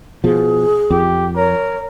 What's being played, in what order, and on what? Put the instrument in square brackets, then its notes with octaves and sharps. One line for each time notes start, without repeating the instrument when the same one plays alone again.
[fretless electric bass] B2 F3 [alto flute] G#4
[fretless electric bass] F2 [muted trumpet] G4
[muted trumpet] A#4 [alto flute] C#5